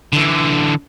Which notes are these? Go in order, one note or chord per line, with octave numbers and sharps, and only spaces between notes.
D3 E3